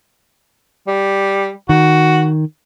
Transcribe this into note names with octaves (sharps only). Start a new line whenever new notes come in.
G3
D#3 F#4